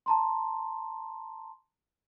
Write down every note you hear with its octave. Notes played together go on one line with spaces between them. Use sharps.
A5 A#5 C6